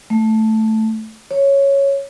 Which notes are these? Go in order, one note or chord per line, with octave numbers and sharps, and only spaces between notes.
A3
C#5